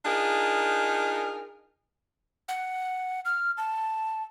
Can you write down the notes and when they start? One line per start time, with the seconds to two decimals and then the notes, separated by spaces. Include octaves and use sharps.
0.05 D4 D#4 F4 G#4 A#4
2.49 F#5
3.25 F6
3.58 A5